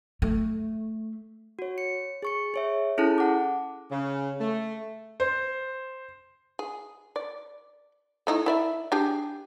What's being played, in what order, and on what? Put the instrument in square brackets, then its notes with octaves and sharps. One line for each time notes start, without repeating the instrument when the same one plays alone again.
[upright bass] A3
[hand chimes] F#4 C#5
C#7
G#4 C#6 C#7
G#4 C#5 E5
C#4 E4 G#4 A4 A5 F#6
F#5 D6
[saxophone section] C#3
A3
[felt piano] C5
[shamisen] G#4
D5
A3 D#4 E4
E4 D5 E5
D4 G4 G#4